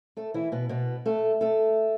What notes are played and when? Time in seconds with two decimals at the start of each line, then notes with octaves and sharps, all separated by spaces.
0.17 A3 A4
0.34 E3 E4
0.52 B2 B3
0.69 B2 B3
1.06 A3 A4
1.41 A3 A4